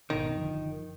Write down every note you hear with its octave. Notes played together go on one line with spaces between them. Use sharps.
G#1 B2 D#3
F#1 D3 F3